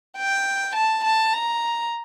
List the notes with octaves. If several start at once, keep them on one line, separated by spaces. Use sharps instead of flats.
G5
A5
A5
A#5